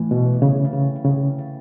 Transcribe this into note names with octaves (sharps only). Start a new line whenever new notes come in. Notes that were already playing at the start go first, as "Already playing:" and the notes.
Already playing: A2 E3
B2
C#3
C#3
C#3